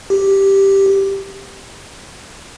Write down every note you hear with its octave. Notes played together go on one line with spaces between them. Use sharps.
G4